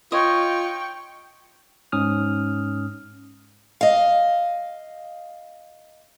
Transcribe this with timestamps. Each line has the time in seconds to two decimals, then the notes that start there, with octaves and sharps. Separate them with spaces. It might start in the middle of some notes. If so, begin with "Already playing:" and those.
0.12 F4 C#5 D#5 G5 C#6
1.92 G#2 C#4 D#6 F6
3.81 D#5 F5